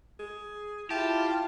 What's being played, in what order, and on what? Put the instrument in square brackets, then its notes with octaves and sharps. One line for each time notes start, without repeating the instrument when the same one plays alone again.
[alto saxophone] G#4
[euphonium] E4 [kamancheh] F4 [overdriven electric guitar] G4 [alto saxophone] A5